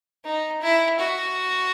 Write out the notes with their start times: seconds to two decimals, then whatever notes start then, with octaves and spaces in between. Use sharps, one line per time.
0.25 D#4
0.62 E4
1.00 F#4